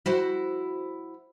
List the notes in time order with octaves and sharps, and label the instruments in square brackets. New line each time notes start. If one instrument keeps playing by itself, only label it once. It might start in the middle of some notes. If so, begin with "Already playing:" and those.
[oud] E4 F#4 C5